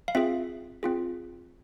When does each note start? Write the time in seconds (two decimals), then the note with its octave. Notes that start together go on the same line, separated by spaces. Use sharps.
0.08 F5
0.15 C4 F4 G#4 E5
0.83 C4 F4 G#4